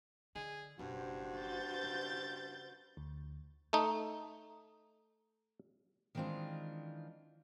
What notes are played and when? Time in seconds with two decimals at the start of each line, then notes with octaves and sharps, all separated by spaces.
0.35 D3 G#4
0.79 F#1 G2 B2 F#4 C5
1.37 G6 A6
1.84 C#3
2.97 D2
3.73 A3 D#4
6.15 D#3 E3 G#3 C4 D4 F4